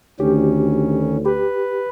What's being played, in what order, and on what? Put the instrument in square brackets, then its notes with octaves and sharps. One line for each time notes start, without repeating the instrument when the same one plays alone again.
[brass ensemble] D2 [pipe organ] D#3 C#4 [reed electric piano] G4
[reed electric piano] G4 [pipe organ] B4